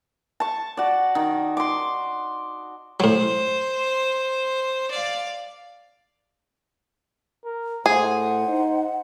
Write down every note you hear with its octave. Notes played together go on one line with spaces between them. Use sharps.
A5 C#6
F#4 D5
D#3
C6 D6
A2 F#3 C5
D5 F5
A#4
A2 G#4 C5 F#5
D#4